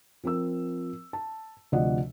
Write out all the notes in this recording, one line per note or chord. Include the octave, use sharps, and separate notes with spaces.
F3 C4 A#4 E6
A5
D2 C3 F3 D5 D#5 F#5